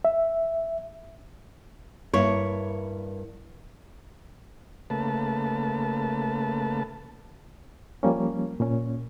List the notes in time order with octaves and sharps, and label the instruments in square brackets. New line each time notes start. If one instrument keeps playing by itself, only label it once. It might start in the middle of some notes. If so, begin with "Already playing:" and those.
[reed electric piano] E5
[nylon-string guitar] G2 A#3 E4 [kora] C#5
[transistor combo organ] C#3 A3 A#3 B4 A5
[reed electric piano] F3 G3 A#3 C#4
A#2 C#4